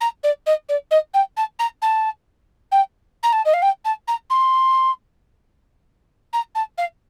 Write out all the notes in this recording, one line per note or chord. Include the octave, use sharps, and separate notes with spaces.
A#5
D5
D#5
D5
D#5
G5
A5
A#5
A5
G5
A#5
A5
D#5
F5
G5
A5
A#5
C6
A#5
A5
F5